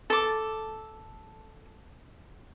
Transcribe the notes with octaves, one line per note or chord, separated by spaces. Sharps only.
A4 D6